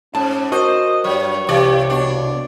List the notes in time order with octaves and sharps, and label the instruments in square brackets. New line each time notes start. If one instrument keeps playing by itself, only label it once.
[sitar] G#2 [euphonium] C#4 [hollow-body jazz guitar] A5
[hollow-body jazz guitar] F#4 [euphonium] A#4 [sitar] C5 [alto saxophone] D#5
[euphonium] G2 [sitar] F#3 [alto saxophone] C#5
[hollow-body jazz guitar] C2 [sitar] E3 D5 [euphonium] G4
[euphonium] B2 [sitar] D4